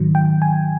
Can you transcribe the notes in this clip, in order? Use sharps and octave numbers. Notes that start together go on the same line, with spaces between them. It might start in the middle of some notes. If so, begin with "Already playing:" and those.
Already playing: G#2 D#3 F#3
G5
G#5